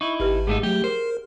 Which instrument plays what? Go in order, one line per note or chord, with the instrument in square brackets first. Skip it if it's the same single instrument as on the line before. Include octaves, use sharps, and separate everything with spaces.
[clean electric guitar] D#4 E4 [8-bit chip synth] C#6
[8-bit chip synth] G#1 [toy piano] G4 B4 E5
[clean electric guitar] G#2 A3 D#4 [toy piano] G#4 F5 F#5
[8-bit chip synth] F#3 A3 [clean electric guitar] G4
[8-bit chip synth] A#4 [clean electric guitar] C5